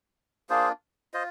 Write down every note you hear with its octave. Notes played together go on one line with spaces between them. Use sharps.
A#3 D4 F4 G#4 C5
F4 C5 D#5